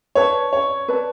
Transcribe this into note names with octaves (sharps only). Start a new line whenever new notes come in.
B4 C#5 D5 A5
C#5
B4 D5 A5